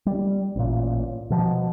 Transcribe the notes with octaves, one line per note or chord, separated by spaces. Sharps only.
G3
A1 A#2
B2 F3